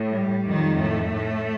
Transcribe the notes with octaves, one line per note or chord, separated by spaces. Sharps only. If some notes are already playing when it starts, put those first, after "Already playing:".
Already playing: A2
G3
F2 D#3
A2 A3
A2